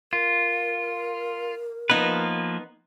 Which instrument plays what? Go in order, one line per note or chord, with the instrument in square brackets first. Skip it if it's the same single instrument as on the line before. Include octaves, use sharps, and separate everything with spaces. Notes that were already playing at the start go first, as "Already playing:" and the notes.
[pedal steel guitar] F4 [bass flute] A#4
[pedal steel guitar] F3 A#3 B4 [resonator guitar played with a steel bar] B3 D#4